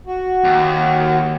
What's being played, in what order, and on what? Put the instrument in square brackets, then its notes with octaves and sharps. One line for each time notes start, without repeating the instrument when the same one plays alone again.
[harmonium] F#4
[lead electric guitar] D#2